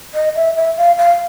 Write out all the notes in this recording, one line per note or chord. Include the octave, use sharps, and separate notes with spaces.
D#5
E5
E5
F5
F5